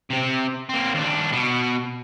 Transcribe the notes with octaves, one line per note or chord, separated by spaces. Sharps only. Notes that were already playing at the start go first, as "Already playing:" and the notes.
C3 C4
A#3 C4
D#2 D4
B2 B3